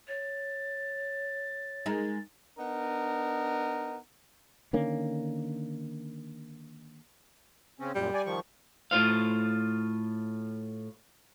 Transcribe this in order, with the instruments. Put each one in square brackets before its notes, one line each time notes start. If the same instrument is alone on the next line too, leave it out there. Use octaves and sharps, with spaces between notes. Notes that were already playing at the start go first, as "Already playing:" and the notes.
[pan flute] C#5 [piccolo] A6
[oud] G#3 D#4 A#4
[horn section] B3 D4 D#4 A#4
[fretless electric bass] D3 D#3 A#3 C#4
[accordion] C#3 C4 C#4
[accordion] F#2 A#2 [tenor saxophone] G3
[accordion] D5 G#5
D#3 F3 C#6
[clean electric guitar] A2 F4 C5 F5